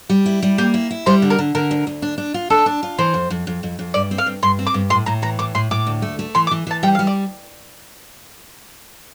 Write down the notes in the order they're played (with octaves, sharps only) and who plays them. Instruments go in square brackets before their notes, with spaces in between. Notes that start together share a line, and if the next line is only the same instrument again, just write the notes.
[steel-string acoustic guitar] G3
E4
G3
[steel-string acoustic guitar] A#3 [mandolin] G4
[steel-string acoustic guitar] E4
E4
[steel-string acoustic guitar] G3 [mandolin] C5
[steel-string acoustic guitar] D3
[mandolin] A#4
[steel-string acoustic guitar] D3
[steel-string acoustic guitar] D3 [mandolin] A#4
[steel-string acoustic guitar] D2
D2
D4
D4
F4
[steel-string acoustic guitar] D4 [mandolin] A4
[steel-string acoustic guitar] D4
F4
[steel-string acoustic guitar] E3 [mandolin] C5
[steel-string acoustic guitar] F2
F2
F2
F2
F2
[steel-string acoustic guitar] G2 [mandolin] D5
[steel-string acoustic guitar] C4
[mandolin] F5
[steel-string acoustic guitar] G2
[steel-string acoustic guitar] G2 [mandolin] C6
[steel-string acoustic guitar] C4
[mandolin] D6
[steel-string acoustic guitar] G2
[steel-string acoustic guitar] A2 [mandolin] C6
[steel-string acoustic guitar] A2 [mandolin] A#5
[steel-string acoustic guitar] E3 [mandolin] A#5
[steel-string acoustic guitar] A2 [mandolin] D6
[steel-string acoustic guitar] A2 [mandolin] C6
[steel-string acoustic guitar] A2 [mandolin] D6
[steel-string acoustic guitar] D2
A3
A3
[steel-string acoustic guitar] E3 [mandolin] C6
[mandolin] D6
[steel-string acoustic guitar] E3
[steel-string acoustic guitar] E3 [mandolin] A5
[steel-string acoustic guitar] G3 [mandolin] G5
[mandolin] F5
[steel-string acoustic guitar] G3
[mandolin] D5